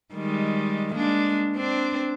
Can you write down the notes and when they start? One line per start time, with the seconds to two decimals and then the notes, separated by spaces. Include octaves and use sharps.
0.14 D#3 G3 G#3
0.95 G#3 A#3 D4
1.56 C4 D4